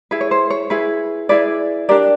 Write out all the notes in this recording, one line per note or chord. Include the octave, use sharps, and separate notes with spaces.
E4 G#4 B4
C#5
C5
C#5
E4 G#4 B4
E4 G#4 B4 D5
D4 G4 A#4 D5